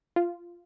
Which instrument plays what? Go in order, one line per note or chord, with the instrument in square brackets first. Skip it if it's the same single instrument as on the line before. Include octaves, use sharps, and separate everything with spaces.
[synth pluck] F4